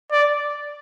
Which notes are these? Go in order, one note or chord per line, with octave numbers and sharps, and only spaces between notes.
D5